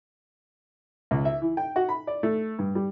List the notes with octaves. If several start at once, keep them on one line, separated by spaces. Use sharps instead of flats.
C#2
E5
E3
G5
F#4
B5
D5
A3
G2
G3